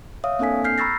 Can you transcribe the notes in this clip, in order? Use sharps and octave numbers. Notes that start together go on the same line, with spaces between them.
C#5 E5 F5 D#6
A#3 C4 D4 A4 G#5 B6
F6 G6 B6 C7
A#5 B5 C#6 E6 A6 A#6